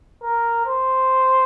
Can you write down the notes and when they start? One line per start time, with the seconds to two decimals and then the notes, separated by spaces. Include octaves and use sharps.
0.23 A#4
0.66 C5